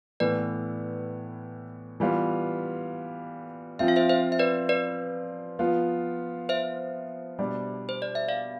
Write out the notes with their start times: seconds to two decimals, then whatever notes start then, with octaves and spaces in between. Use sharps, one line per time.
0.20 A2 E3 B3 B4 D5
2.00 E3 G3 B3 F4
3.79 F3 C4 F4 E5
3.88 F5
3.96 C5 E5
4.09 C5 E5
4.32 E5
4.39 B4 D5
4.69 B4 D5
5.59 F3 B3 F4
6.49 C5 E5
7.39 B2 G3 D4
7.89 C5
8.02 D5
8.15 E5
8.28 D5 F5